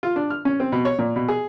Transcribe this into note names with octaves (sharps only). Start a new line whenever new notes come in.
F4
D4
F6
C#4
C4
B2
C#5
A#2
B2
G#4